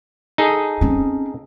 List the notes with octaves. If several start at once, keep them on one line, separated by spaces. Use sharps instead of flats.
D#4 G#4 A4
C4 C#4